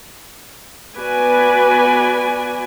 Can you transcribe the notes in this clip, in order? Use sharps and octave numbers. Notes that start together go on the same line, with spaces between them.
B3 F#4 B4 D5 G#5